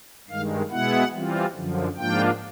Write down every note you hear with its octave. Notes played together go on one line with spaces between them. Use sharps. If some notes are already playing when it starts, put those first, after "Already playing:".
G2 D#3 G#3 F5
B2 G#3 B3 E4 F#5
E3 G3 C4 F4
F#2 D3 F3
G#2 F3 A#3 D4 F4 G5